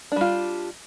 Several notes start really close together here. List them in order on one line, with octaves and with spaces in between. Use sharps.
D4 G3 F4